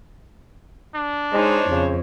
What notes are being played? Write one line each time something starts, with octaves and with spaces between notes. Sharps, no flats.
D4
G#3 D#4 C5 C#5
F2 C#3